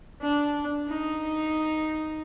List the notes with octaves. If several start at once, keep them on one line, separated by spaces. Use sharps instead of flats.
D4
D#4